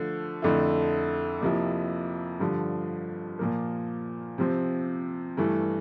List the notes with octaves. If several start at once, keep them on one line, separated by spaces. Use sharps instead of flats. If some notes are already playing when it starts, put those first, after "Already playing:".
Already playing: D3 F3 A3
F2 D3 A3 E4
F2 C3 F3 A#3 E4
G2 D3 F3
A#2 F3 A#3
C3 F3 C4
G2 E3 A3